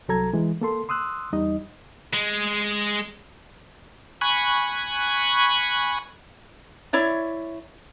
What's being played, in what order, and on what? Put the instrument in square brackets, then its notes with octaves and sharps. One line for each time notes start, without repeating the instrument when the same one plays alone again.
[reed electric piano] C2 F#3 A4 A#5 G#6
E3 G#3
A#3 A4 C6
C6 D#6 E6 F#6
E2 G3 D#4 D#5
[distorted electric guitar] G#3
[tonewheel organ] G#5 B5 C#6 F#6
[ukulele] E4 C#5 D5 E5